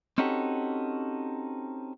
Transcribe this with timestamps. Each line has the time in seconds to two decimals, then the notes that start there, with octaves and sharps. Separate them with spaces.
0.18 C4 C#4 D#4 F#4 G4 A4